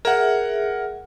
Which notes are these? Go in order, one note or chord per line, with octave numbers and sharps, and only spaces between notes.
G#4 A#4 E5 F#5